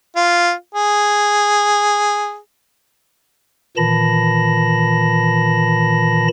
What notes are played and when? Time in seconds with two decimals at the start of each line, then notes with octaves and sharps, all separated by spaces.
0.16 F4
0.75 G#4
3.77 A#2 D#3 E3 A5 B5 A#6